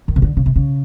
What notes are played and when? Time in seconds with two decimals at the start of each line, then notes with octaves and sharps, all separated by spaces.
0.08 D#3
0.16 C#3
0.22 D3
0.37 C#3
0.46 C3
0.56 C#3